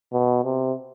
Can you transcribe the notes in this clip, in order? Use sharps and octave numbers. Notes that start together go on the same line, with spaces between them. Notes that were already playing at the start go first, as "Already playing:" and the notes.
B2
C3